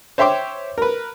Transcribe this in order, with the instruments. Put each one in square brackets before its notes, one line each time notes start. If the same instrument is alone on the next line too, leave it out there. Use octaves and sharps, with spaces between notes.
[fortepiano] C5 C#5 E5 G5 C6 D6
A#4 B4